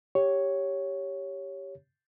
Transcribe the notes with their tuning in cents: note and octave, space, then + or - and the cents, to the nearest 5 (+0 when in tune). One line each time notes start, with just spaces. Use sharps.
G4 +0 C#5 +0